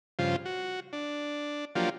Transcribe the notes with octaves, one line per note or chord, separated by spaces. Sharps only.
G2 C#3 F3 F4 C5
F#4
D4
F3 F#3 A#3 D4 F4 G4